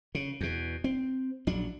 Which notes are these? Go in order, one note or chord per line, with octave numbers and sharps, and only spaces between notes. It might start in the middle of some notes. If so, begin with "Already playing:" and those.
C#3
E2 B2
C4
A#1 F#3 D4